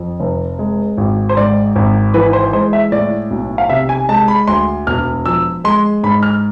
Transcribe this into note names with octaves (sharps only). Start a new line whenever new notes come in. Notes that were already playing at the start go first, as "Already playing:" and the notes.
Already playing: F2
F1
G#3
G#1
C5
G#2 D5
G#1
E3 B4
C5
G#3 C5
E5
A2 D5
B1
F5
C3 E5
G#5
G#3 A5
B5
D2 C6
E1 F6
F3 E6
G#3 C6
G#2 B5
F6